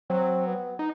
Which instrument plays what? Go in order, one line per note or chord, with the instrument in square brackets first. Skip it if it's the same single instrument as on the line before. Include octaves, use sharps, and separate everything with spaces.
[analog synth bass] F#3 [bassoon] C4
[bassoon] B3
[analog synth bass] D#4